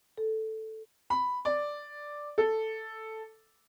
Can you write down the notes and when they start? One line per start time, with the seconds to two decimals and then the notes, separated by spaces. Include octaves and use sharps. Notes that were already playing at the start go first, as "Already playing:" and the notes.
0.18 A4
1.10 B5
1.45 D5
2.38 A4